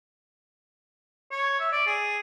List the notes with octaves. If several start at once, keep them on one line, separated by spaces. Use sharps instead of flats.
C#5
E5
D5
G#4